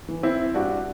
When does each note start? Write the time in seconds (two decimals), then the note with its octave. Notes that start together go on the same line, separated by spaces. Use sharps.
0.08 E3
0.23 C4 E4
0.54 G2 D4 F#4